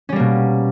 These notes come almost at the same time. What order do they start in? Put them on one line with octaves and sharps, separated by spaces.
C#4 G3 A#3 B2